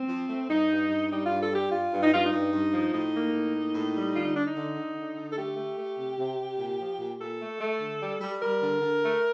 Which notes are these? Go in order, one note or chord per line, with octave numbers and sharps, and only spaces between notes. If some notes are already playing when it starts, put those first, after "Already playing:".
Already playing: C4
F3
A3
G2 D#4
G2
G2
G3 D#4
F4
G2
A4
G3 G4
G2 F4
G2
D#4
G2 F4
D#4
G2
G2
F3
A2 D#4
A#3
A2
A#3
A2
G3
D3 F4
D#4
D3 D4
D#4
D3
D3
D3
D3
A4
A3 G4
A3
A3
C3
C3
C3
A#2
F3
A#2
A#2 A4
A3
A3
D3
G3
G3
G3 A#4
D3
D3
A3